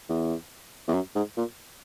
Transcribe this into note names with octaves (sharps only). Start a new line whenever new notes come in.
E2
E2
F#2
G#2
A#2